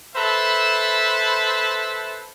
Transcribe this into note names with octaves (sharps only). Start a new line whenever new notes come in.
A4 B4 C5 E5 A5 B5